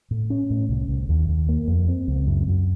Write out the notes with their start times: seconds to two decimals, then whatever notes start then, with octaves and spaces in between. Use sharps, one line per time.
0.11 A2
0.30 C#4
0.50 A2
0.69 C2
0.89 C2
1.09 D#2
1.29 D#2
1.49 A#3
1.68 F2
1.88 C4
2.08 C#2
2.27 F#2
2.47 F#2